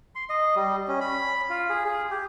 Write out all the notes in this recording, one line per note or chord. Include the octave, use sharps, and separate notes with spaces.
C6
D#5
G3
C#4
B5
F4
G#4
G#4
G4